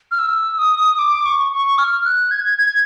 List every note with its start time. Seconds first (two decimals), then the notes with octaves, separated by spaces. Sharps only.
0.11 F6
0.19 E6
0.58 D#6
0.99 D6
1.26 C#6
1.52 C#6
1.78 F6
2.05 F#6
2.31 G#6
2.58 G#6